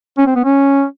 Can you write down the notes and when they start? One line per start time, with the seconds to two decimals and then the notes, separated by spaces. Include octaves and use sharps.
0.18 C#4
0.27 C4
0.36 B3
0.45 C#4